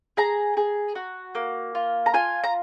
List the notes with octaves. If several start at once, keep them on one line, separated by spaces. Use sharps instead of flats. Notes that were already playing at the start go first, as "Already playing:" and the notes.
G#4 A#5
G#4
F#4
A#3
F4
A#5
F4 G#5
A#5